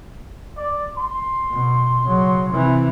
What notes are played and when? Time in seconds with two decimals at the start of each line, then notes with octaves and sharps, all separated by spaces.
0.58 D5
0.97 C6
1.51 B2
2.04 C#3 F#3
2.50 C3 E3